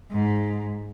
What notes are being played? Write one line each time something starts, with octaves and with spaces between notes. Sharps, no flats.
G#2